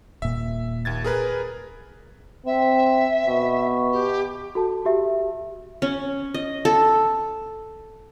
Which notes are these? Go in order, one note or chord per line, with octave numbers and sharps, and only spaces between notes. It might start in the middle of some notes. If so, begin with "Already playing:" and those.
D#1 A#2 E5
D#2 G#6 A6
G#4 A#4 B4
C4 E5
B2
G4
F#4 A4 A5
F#4 G4 E5
C#4
D#5
A4